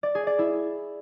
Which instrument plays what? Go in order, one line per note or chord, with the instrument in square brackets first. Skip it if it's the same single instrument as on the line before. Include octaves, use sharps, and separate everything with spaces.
[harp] D5
G#4
D5
E4